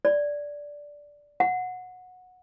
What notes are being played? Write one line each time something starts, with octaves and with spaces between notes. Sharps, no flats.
D5
F#5